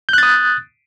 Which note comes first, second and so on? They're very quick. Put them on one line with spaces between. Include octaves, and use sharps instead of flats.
G6 F#6 A6 D#6